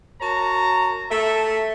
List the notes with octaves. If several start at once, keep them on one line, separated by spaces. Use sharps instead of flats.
F#4 A#4 C#5 A5 A#5
A3 A4 E5